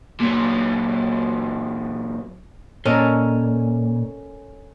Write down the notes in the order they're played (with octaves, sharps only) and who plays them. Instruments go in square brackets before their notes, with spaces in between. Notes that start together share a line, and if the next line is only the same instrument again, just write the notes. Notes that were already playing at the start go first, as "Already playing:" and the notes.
[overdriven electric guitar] A#2 F#3
[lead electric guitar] A#2 [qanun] C#4 [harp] A4 A#4 D#5